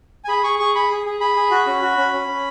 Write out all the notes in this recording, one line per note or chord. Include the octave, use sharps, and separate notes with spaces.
G#5
G#4 B5
G#4 C#6
G#4 C#6
G#4 B5
G#4
G#4
G#4 B5
G#4
F#4
C#4
F#4
C#4
C#4
C#4